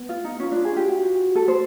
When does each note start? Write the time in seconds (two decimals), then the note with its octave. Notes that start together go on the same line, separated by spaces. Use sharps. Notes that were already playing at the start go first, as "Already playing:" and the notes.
Already playing: B3
0.09 F4
0.24 D#4
0.40 C#4 F4
0.52 D4
0.65 G#4
0.76 G4
0.87 F#4
1.35 A4
1.48 C5